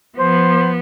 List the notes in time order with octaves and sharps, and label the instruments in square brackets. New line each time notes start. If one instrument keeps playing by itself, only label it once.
[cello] F3 B3 [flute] C5